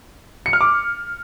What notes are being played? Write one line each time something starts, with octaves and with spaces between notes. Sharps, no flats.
C#7
F6
D6